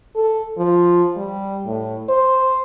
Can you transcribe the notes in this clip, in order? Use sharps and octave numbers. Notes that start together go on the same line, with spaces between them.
A4
F3
G3
A2
C5